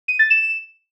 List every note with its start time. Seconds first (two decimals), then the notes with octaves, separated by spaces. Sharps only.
0.08 D#7
0.19 A6
0.30 E7